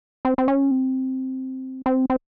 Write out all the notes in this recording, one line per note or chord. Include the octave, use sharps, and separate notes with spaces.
C4
C4
C#4
C4
C4
C4